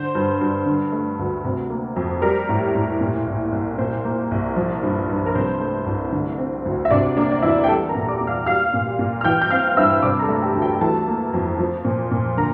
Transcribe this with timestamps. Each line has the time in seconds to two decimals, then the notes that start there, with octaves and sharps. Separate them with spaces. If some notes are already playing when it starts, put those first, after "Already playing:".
Already playing: D3 C5
0.15 G2
0.41 G2
0.66 D3
0.92 A3
1.19 D2
1.44 C3
1.70 A#3
1.96 F2
2.22 G3 A#4
2.49 A2
2.75 A2
3.01 A#2
3.27 C2
3.52 C2
3.78 A#2 C5
4.05 A#3
4.31 C2
4.56 F3
4.83 G2
5.09 G2
5.26 A#4
5.35 C3 C5
5.60 A3
5.86 C2
6.12 D3
6.38 C4
6.65 D2
6.85 E5
6.91 C3 D4 D5
7.17 A#3 D4 D5
7.32 D5
7.42 E2 E4 E5
7.64 G5
7.69 G3 A4 A5
7.89 A#4 A#5
7.95 A#2
8.08 D5 D6
8.21 A#2
8.27 F5 F6
8.46 G3 F5 F6
8.74 A#2
8.99 A#2
9.21 F6
9.24 E3 G5 G6
9.42 G6
9.50 C4 F5 F6
9.77 G2 E5 E6
10.02 C3 D5 D6
10.19 A#5
10.22 A4 A5
10.29 A3
10.36 A5
10.42 G4 G5
10.55 D2
10.62 G4 G5
10.74 G5
10.81 E3 A4 A5
11.08 A#3
11.33 F2
11.59 F3
11.85 A#2
12.11 A#2
12.37 D3 A#4 A#5